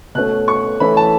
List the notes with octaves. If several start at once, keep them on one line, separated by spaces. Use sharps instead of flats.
B2 A3 C#4 F#6
C#6
E3 A3 C#4 E4 B5
A5